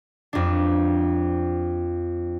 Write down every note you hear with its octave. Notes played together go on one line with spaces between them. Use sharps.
F2 D4